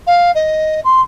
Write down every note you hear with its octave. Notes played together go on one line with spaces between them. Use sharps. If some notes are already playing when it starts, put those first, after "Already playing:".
F5
D#5
C6